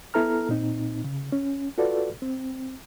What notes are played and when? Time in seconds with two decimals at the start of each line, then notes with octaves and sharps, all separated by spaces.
0.14 B3 E4 A4 A#5 F6
0.49 A#2 C4 D#4
1.04 C#3
1.32 C#4
1.78 F4 F#4 A4 B4 D5
2.22 C4